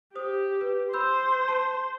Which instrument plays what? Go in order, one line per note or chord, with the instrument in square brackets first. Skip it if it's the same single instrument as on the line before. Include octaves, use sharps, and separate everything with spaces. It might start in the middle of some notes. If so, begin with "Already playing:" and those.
[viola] G4 [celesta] C5 D#6
[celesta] B4
[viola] C5 [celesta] B5 E6 G6
[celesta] A5 C7